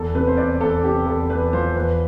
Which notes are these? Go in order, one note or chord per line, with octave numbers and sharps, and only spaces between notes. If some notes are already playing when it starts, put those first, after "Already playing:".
Already playing: E2 A4
C3 B4
C5
E2 D5
E2 A4
C3 G4
E2 A4
E2 B4
F3 C5
E2 B4